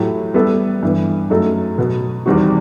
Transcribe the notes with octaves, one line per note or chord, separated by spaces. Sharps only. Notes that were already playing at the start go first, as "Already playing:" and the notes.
Already playing: A2 F#3 A3 E4 G4
G3 B3 E4 A4
G2 E3 B3
F#2 F#3 A3 D#4 A4
B2 F#3 B3
E2 D#3 G3 C4 F#4